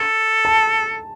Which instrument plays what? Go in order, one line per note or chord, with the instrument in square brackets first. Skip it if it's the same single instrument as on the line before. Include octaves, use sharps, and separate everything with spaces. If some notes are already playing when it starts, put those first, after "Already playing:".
Already playing: [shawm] A4
[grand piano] A5